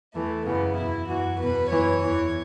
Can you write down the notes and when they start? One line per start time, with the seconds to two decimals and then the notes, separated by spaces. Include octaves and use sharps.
0.14 E2 E3 A3
0.46 F#2 C#3 E3 B3
0.77 E2 B2 E4
1.08 F#2 E3 F#4
1.39 E2 B2 B4
1.70 F#2 E3 C#5
2.02 E2 E3